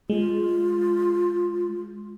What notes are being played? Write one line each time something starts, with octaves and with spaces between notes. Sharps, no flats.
G#3 F4